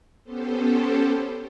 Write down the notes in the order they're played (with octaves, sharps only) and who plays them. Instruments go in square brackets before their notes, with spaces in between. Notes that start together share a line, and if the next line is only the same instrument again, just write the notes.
[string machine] B3 C#4 G4 A4 C5